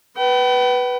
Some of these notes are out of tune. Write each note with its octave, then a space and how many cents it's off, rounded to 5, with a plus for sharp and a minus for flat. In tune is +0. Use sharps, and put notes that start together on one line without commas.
B4 +0 G5 -45